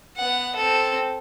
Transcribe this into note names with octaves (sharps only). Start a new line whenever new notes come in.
B3 F#5
C4 A4